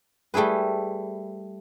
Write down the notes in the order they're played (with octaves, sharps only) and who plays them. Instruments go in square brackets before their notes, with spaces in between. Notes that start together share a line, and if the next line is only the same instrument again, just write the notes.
[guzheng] G3 A3 E4 G#4 B4